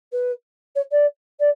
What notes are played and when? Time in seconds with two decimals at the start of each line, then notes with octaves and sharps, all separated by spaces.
0.12 B4
0.75 C#5
0.91 D5
1.40 D5